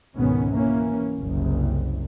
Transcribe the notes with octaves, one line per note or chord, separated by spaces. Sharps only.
G#1 C#2 B2 D#3 B3 C#4
E3 A#3 C#4
F#1 C2